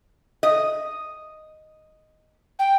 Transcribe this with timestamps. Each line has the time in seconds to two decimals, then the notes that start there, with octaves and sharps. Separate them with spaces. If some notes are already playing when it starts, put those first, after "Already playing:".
0.43 D#5
2.59 G5